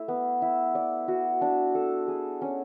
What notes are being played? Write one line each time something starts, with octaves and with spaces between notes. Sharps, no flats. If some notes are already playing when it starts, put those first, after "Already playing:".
Already playing: A3 E4
B3
E4
D5
F#4
D4
A4
G#4
C#4